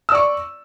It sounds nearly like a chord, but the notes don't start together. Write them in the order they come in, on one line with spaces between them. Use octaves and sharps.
E6 D5 C#6